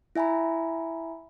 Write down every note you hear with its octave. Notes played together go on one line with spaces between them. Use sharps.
E4 E5 G#5 A#5 B5